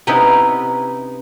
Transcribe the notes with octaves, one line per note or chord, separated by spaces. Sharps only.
C3 B3 C#4 D#4 E4